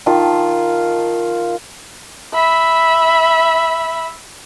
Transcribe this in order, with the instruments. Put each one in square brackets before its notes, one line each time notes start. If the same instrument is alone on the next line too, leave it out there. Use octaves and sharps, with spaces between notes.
[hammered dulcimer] D#3 F4 A5
[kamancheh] E5 B5